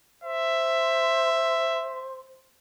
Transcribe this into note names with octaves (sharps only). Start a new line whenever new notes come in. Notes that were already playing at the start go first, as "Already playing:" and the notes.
C5 E5